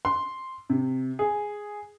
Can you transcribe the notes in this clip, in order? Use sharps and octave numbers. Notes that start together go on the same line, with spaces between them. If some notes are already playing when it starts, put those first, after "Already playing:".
C6
C3
G#4